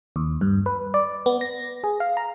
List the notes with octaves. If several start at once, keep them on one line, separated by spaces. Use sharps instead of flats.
D#2
G2
B4
D5
B3
A#6
G#4
F5
A#5